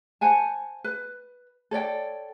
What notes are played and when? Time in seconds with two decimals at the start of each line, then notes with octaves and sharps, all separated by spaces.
0.21 C5 F#5 G#5 A5
0.84 B4
1.71 A4 C#5 D5 G5